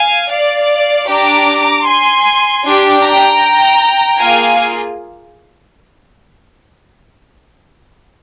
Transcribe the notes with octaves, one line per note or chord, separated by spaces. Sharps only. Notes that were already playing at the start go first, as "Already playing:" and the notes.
Already playing: F5 G#5
D5 F5
D4 G4 A#5 D6
G#5 C6
D4 G4
G5 A#5
A#3 F4 G#4 F5 G#5